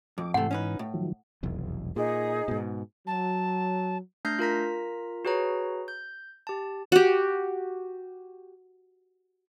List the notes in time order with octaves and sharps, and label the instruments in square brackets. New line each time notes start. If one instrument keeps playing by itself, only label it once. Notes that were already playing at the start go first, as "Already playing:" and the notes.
[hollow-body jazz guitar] F2 [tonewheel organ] D6
[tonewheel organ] G#2 E3 [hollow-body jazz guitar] C3 A3 [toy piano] F#5
[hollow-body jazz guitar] C#4 D#4 B4
A2
[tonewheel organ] D#3 F3 F#3
[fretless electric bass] F1 B1 E2
[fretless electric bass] A#2 [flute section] D#4 G#4
[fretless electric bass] G#2 B2
[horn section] F#3 [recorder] A5
[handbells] A3 D4 F6 G6 A#6 C7
F4 A#4 A#5 B6
F#4 G#4 B4 C#5 A#5
G6
G4 A5
[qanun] F#4 G4